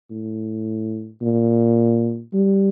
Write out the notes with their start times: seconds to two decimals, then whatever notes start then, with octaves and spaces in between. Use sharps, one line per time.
0.11 A2
1.22 A#2
2.33 G3